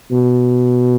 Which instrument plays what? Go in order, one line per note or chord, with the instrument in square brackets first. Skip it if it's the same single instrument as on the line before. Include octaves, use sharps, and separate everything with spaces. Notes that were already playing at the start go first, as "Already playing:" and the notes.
[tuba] B2